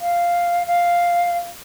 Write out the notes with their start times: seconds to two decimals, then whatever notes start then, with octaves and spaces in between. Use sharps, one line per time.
0.01 F5
0.67 F5